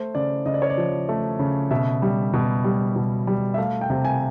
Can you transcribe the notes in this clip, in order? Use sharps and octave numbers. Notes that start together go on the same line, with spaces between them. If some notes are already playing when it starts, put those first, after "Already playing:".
Already playing: A3 C5
C#3 D5
C#3 D#5
D5
C#5
D5
F3
A3
C#3
B2 E5
G3
B2
G3
B2
G3
E5
A3 F5
G5
C3
G#5